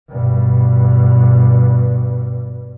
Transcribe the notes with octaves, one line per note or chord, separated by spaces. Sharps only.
G2 B2